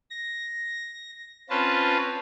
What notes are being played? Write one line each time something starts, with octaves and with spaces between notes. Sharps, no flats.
A#6
C4 C#4 F4 B4 A5